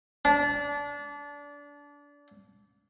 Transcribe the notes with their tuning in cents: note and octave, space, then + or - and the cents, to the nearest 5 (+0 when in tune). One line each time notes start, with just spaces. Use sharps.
D4 -25